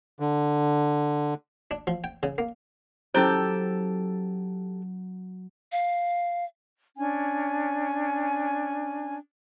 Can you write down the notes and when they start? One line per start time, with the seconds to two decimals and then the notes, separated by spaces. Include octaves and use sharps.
0.20 D3
1.71 D4
1.87 F3
2.04 G5
2.23 C#3
2.38 A#3
3.14 F#3 C#4 E4 G4 A4 C5
5.72 F5
6.98 C#4 D4 G#5